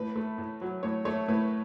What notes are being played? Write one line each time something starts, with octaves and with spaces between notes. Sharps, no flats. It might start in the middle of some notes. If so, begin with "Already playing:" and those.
Already playing: A2 B4
A3
A2
F#3
A2 C#5
A3 C#5
A2 B4